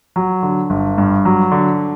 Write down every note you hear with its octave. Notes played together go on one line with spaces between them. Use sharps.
F#3
D3
G1
G2
F#3
D3